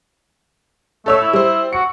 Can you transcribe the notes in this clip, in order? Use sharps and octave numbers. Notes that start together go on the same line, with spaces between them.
A3 A4 C#5 E6
E4
G3 C5
F#4 C#7